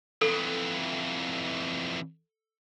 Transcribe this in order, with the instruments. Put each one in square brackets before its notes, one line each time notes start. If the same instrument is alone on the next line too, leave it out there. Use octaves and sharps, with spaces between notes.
[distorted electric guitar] F2 E3 [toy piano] A4